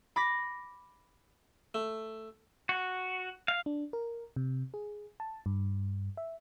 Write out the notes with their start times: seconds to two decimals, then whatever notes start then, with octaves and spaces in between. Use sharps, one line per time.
0.16 B5 D6 A#6 B6
1.74 A3
2.69 F#4
3.48 F5
3.66 D4
3.93 A#4
4.36 C3
4.74 G#4
5.20 A5
5.46 G2
6.17 E5